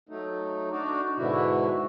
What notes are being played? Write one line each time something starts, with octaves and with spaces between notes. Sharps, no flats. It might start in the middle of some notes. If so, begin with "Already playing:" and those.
F#3 A3 D#4
D4 D#4 F#4 D5
G#2 B2 D3 E4 F#4